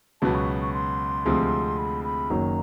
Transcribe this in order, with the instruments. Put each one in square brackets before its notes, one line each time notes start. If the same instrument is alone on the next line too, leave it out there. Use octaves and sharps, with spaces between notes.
[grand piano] C#2 B2 F#3 B3 [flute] A5
[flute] C#6
C#6
C6
[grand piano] D2 C3 F3 G#3 C4
[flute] B5
B5
[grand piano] F#1 F#2 D#3 F#3 A#3 [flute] A#5